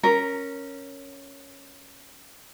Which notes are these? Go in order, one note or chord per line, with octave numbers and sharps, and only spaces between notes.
C#4 A#4